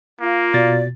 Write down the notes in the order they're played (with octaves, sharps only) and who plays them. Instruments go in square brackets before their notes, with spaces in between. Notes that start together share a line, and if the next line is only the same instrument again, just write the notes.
[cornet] A#3 [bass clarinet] F4
[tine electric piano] B2 A6 [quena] D5